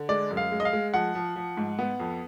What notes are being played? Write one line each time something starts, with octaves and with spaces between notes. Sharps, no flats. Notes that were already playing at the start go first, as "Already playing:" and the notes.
Already playing: D3
G#3 D5
F#2
F5
G#3
D#5
F5
G#3
F3 F#5
F3
F3
G#2
B3
F2